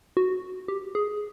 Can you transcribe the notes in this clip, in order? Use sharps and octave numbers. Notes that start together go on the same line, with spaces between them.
F#4
G4
G#4